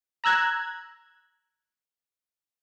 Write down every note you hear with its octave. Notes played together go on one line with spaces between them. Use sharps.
A#5 E6 F#6 G#6